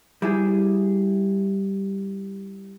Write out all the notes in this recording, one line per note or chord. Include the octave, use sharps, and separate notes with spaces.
G3 E4 G#4